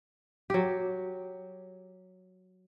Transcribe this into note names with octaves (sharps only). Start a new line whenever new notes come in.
F#3 G4